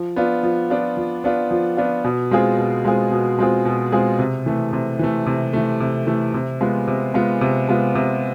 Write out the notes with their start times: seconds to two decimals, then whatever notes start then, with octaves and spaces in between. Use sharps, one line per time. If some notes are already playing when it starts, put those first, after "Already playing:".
Already playing: F3
0.16 B3 D4 F4
0.43 F3
0.70 B3 D4 F4
0.97 F3
1.24 B3 D4 F4
1.51 F3
1.77 B3 D4 F4
2.04 B2
2.31 G#3 C4 F4 G#4
2.58 B2
2.85 G#3 C4 F4 G#4
3.12 B2
3.39 G#3 C4 F4 G#4
3.65 B2
3.92 G#3 C4 F4 G#4
4.19 C3
4.46 E3 A3
4.73 C3
4.99 E3 A3
5.26 C3
5.53 E3 A3
5.80 C3
6.07 E3 A3
6.34 C3
6.61 G#3 B3 F4
6.88 C3
7.14 G#3 B3 F4
7.41 C3
7.69 G#3 B3 F4
7.95 C3